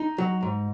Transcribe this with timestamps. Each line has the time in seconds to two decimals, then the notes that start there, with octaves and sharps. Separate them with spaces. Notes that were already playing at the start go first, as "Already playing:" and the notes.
Already playing: D#4
0.18 F#3
0.43 G#2